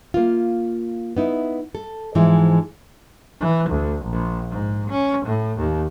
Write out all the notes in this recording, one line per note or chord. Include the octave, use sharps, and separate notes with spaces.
A#3 F4
B3 D#4 E4
A4
G#2 E3 F3 G#3 D#4
E3
D2
A#1
G#2
C#4
A2
D#2